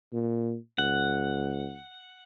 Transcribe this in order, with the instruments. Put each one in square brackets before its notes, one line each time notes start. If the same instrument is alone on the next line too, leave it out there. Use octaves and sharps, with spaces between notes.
[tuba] A#2
[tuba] C#2 [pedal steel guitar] F#5